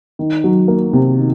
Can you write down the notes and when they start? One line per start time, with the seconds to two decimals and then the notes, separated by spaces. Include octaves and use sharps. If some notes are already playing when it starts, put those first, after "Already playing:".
0.19 D#3
0.44 F#3
0.68 A#3
0.93 C3
1.19 D#3